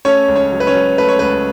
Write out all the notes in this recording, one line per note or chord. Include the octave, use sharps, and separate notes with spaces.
A3 C#4 C#5
C#2
C#4 C#5
F#3
B4
C#4 C#5
F#3
A3 B4
C#5
C#2 B4